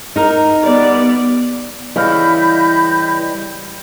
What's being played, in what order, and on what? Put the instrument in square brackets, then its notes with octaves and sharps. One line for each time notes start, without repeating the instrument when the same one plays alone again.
[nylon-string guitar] D#4 A#4
[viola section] G3 B3 D5
[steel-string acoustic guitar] C#3 E3 [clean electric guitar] G3 F5 [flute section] D#5 B5 G6